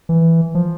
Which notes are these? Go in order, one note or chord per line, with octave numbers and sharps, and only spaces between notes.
E3
F3